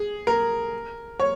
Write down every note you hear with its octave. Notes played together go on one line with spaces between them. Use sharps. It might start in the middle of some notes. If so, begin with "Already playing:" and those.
Already playing: G#4
A#4
C#5